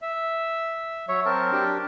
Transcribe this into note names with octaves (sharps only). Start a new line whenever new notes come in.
E5
F#3 C#5 E5
C4 A#4 A5
D4 G4